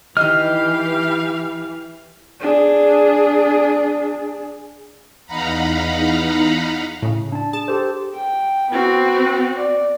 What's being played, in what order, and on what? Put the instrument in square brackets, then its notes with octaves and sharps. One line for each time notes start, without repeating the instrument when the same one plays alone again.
[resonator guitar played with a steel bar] D#3 D#5 [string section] E3 [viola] G4 F5 [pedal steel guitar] F6
[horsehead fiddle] D4 G#4
[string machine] E2 D#4 F5 F#5 A#5 B5
[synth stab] A2 C#3
[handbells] D4 A5
[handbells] G#4 [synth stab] A5
[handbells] G4 A4 C5
[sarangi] G5
[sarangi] B3 [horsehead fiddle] C4 F#4
[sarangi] D5